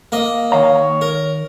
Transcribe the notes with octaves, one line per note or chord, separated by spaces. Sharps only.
A#3 D#5
D#3 C#5 F5 A#5
A#4